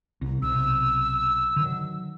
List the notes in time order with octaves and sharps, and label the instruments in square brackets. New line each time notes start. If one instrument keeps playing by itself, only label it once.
[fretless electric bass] C2
[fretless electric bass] B1 C3 [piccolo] E6
[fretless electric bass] D3 D#3 F#3